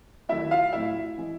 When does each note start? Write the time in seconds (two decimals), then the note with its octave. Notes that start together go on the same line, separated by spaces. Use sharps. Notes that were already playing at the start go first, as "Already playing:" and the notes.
0.29 D#2 D#3 F#3 A3 E4 E5
0.51 F4 F5
0.72 A2 F#3 A3 E4 E5
1.18 E3 G#3